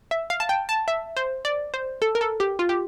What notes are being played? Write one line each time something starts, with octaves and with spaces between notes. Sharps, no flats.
E5
F5
A5
G5
A5
E5
C5
D5
C5
A4
A#4
A4
G4
F4
G4